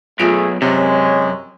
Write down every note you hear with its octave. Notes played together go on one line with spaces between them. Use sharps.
B1 A3 F4 G#4 D7
F#2 C3 G#3 C#5